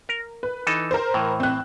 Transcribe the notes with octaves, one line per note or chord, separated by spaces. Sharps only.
A#4
B4
E3 D#4 A4
A#4 C5
A2 E3
C4 F#6